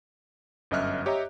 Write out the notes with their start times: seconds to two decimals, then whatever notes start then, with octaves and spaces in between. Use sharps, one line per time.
0.71 G1 F#2 D#5 E5 F6 F#6
1.06 G4 C#5 D#5 E5 A#5